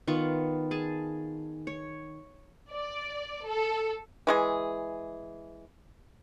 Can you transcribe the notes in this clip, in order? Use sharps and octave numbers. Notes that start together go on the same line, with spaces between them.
D#3 B3 F4 C#6
G#4 G#5 A5
C#5
D5
A4
E3 G#3 G#4